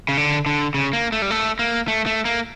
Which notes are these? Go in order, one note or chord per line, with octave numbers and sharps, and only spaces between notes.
C#3
D3
D3
C#3
A#3
A3
G3
A3
A#3
A3
A3
A#3